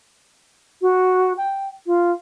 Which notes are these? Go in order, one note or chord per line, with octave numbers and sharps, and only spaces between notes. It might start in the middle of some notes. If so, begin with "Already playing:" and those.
F#4
G5
F4